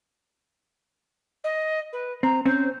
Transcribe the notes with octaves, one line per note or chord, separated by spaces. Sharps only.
D#5
B4
C4 A#5
C4 C#4 C5